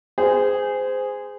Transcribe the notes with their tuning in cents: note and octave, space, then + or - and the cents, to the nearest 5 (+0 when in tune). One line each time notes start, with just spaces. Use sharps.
G#4 -10 C5 -25